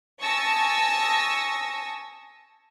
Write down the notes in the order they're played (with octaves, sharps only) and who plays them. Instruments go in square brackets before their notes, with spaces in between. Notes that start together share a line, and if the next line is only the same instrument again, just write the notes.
[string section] G#5 A5 C#6 D#6 E6 A#6